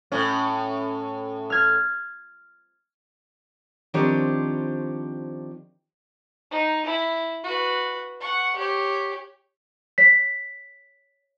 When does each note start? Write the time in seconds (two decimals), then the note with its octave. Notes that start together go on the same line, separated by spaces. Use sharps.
0.12 A2 C#4
1.50 F6 G#6
3.94 D#3 F3 C4 D4 G4 C#5
6.51 D#4
6.85 E4
7.43 F#4 B4
8.21 F#5 C#6
8.56 G4 C#5
9.98 C#5 B6